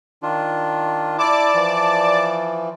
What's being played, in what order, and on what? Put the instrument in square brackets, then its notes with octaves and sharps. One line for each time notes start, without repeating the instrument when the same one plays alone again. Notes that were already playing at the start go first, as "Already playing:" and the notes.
[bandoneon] D#3 D4 F4
[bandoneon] E4 [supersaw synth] D5 A5 D6
[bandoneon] E3 F3